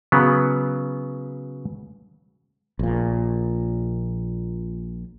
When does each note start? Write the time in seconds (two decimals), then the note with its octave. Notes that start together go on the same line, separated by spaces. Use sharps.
0.12 C#3 F#3 B3
2.79 A#1 A#2